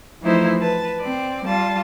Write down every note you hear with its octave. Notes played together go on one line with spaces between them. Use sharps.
E3 F3 A3 D#4 E4 C5
B4 A5
C4 D5
G3 F4 A5